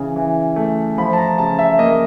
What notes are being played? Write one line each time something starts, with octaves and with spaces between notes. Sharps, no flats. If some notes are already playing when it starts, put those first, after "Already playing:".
Already playing: C#3 E3
E3
A3
F3 B5
A5
A#5
C#3 A5
E5
A#3 D#5